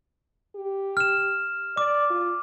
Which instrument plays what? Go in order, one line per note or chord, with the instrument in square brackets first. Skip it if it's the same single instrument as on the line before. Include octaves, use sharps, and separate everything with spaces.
[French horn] G4
[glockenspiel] F6 E7
[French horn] D5 [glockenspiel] D6
[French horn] F4